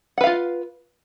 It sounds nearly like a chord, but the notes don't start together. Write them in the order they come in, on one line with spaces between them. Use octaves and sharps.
F#5 B4 F5 F4